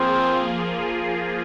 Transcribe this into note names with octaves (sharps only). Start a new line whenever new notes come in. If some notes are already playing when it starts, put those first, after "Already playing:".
Already playing: F3 A#3 C4 F4 G#4